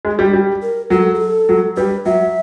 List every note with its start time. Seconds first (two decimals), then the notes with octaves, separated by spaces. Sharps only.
0.05 G#3
0.19 G3
0.33 G3
0.62 A#4
0.90 F#3 A4
1.14 G#4
1.20 A4
1.49 F#3
1.77 G3 B4
2.05 F#3 E5